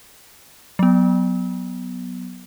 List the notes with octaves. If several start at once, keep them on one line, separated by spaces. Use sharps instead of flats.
F#3 B3